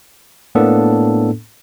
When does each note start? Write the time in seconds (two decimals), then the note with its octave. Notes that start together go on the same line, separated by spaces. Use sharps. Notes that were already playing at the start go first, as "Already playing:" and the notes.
0.55 A2 A#3 B3 D4 A4